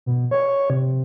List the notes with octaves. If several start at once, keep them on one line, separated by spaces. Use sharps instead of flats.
B2
C#5
C3